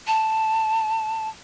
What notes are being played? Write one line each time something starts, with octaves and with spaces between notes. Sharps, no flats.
A5